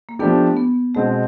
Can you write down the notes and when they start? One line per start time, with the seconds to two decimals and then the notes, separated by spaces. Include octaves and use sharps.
0.09 A#3
0.19 F3 A3 B3 D4 G4
0.57 B3
0.95 B2 G#3 A3 C4